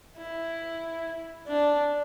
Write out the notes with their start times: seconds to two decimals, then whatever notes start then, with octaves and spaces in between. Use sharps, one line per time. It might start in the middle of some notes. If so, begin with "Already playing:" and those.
0.17 E4
1.48 D4